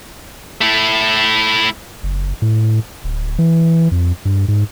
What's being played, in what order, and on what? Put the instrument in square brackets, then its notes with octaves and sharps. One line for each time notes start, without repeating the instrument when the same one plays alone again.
[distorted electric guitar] A3 E4
[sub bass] F#1
A2
D1
E3
F2
G2
G#2